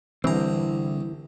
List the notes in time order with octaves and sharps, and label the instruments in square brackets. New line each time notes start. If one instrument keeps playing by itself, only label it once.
[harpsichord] C2 A#5 [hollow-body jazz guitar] D3 C4 [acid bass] E3